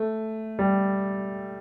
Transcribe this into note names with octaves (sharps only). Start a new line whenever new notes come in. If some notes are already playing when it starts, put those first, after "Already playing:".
Already playing: A3
G3